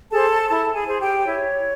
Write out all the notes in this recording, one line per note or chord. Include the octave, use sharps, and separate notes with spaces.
G#4 A4 C5 A5
E4 A4 A5
G#4 G#5
G#4 C5
G4 G5
E4 C#5